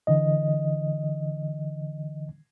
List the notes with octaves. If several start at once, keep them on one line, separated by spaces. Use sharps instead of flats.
D3 E3 D#5